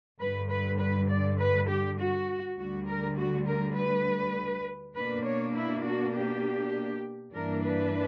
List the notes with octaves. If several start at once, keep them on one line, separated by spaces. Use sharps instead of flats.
G2 D3 G3 B4
B4
B4
D5
B4
G4
F#4
D2 D3 G3 F#4
A#4
F#4
A#4
B4
B2 A#3 D4 B4
C#5
E4
F#4
G4
G2 E3 A#3 D4 A#4
B4